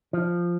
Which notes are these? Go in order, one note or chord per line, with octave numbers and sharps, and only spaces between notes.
F3